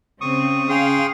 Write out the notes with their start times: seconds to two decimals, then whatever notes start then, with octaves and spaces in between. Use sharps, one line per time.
0.21 C#3 C4 C#6 D#6
0.70 C#3 G#4 F5 G5 C6